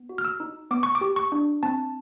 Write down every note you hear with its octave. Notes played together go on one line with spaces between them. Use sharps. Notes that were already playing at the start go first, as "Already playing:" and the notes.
Already playing: B3
F#4
F6
E6
D#4
B3 D6
C#6
D6
G4
C#6
D4
C4 A5